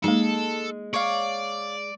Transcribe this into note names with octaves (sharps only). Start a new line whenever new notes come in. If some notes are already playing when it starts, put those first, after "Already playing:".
G#3 A#3 D#4 A4
C#5 D5 F5